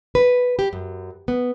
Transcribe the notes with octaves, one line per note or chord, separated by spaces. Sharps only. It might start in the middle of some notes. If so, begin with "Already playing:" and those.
B4
G4
F#2
B3